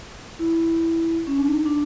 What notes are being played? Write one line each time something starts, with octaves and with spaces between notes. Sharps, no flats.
E4
C#4
D4
D#4
D4